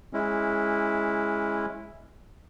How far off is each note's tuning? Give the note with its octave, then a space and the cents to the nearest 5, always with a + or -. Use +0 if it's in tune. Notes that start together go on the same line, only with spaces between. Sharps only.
G#3 +0 C#4 -20 E4 +0